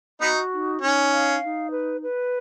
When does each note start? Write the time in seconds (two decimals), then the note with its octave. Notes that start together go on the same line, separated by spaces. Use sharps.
0.21 B3 D#4 F#4
0.51 D#4
0.81 C#4 D#4
1.11 F5
1.42 D#4
1.72 B4
2.03 B4